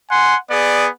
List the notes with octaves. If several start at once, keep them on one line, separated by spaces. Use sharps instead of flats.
F#5 G#5 C6
B3 G#4 D5